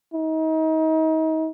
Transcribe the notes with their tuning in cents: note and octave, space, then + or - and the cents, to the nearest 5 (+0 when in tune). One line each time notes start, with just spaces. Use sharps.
D#4 +35